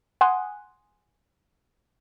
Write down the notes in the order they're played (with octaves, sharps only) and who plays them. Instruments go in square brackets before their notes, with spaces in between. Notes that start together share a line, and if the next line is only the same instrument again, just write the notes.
[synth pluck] F#5 G#5 C6 D#6 F#6